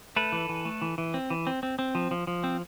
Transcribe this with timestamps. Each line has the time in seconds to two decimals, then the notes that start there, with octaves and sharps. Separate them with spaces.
0.16 A3 A4 B4
0.32 E3
0.49 E3
0.65 A3
0.82 E3
0.98 E3
1.14 C4
1.30 E3
1.47 C4
1.63 C4
1.79 C4
1.95 F3
2.11 F3
2.27 F3
2.44 C4